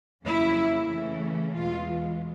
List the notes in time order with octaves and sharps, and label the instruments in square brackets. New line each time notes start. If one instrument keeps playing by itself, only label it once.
[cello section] F2 C#3 F#3 A#3 C#4 E4
C#3 E3 A3 C#4
E2 B2 G#3 F4